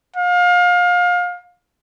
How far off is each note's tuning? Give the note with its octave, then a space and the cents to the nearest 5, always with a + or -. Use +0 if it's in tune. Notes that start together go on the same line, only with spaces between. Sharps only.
F5 +30